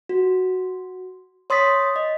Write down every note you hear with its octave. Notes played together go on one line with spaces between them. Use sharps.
F#4
C#5 C6 D#6 A6 B6
D#5